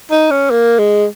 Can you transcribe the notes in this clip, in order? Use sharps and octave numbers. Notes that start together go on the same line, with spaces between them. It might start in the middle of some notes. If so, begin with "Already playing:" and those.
D#4
C#4
A#3
G#3